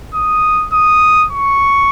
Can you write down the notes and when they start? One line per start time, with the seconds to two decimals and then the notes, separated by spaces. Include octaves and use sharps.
0.14 D#6
0.73 D#6
1.32 C#6